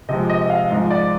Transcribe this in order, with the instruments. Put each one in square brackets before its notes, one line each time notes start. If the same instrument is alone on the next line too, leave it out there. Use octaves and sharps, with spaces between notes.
[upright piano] C3 F3 G#3 D#5
D#5
D#5
F5
G#2 F3 G#3 D#5
D5